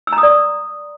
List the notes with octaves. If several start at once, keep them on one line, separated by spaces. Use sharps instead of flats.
E6
A#5
D#6
D5